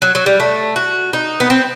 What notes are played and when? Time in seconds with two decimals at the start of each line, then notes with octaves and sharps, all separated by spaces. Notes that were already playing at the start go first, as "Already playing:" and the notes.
0.02 F#3
0.15 F#3
0.26 G3
0.40 A3
0.76 F#4
1.13 D#4
1.40 B3
1.50 C4